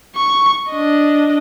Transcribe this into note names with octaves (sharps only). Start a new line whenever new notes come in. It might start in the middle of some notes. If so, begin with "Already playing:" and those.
C#6
D4 D#5